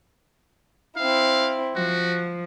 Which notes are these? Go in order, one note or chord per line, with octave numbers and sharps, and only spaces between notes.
C4 E4 F5
F3 F#4